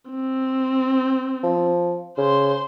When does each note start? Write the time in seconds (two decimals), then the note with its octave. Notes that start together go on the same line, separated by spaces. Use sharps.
0.10 C4
1.44 F3
2.18 C#3 C5 C6